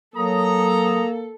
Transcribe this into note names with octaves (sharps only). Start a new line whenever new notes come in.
F#3 A#3 A4 A#5 D#6